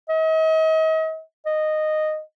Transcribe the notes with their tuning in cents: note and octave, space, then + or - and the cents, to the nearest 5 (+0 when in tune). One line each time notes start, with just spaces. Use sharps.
D#5 +40
D#5 -10